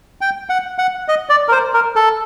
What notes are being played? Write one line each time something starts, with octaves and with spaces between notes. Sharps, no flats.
G5
F#5
F#5
D#5
D5
A#4
C5
A#4
A4